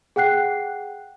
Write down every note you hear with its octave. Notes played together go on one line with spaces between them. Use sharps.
G#4 F#5 G5 F#6 C7